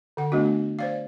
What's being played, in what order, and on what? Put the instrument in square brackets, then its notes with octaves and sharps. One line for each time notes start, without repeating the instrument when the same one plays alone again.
[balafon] D3 F#5
A3 B3 D4 F#4
C5 D5 F5